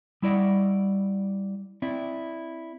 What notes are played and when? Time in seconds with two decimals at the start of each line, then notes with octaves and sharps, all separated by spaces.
0.22 G3 E4 D5 D#5 F#5
1.82 C4 E4 D5